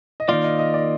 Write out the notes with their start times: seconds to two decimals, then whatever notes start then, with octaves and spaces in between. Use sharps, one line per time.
0.20 D#5
0.28 D#3 A#3 F4 D5
0.44 D#5
0.59 D#5
0.74 D5